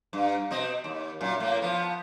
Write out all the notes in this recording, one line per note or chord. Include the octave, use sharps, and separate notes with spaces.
G2
B2 C4 D#5
D#2
F#2 A#2
A2 A#3
F3 B3